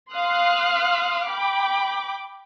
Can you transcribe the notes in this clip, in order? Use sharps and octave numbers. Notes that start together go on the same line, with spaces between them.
F5 C6 D#6 F6 F#6
G5 B5 D6